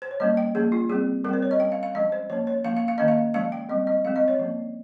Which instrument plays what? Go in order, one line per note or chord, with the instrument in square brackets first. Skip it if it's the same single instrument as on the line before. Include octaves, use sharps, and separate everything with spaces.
[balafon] C5
C#5
G3 A#3 C#4 D#5
G5
F3 A#3 C#4 G#4
F4
G3 C4 G#4
G3 A#4
C4 C5
C#5
D#5
G3 C#4 G5
F5
F5
F3 G#3 C#4 D#5
C5
F3 A#3 C#4 C#5
C#5
F3 A#3 C#4 F5
F5
F5
D#3 A#3 C#4 D#5
F5
F3 G#3 C#4 F5
G5
G3 C4 D#5
D#5
F3 G#3 C4 F5
D#5
C#5
F3 A#3 C#4